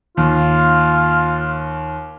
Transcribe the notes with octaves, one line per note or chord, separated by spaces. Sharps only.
D#2 F4